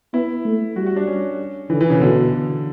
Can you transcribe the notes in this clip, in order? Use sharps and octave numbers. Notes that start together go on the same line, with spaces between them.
B3 E4
A3
G3 F#4
F#4
D4
C#4
D3 E3
E3
C#3
B2 D3